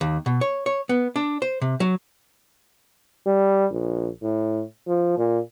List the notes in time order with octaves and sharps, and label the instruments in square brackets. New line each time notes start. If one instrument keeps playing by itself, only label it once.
[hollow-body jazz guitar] D#2
B2
C#5
C#5
B3
D4
C5
C3
F#3
[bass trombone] G3
A#1
A2
F3
A#2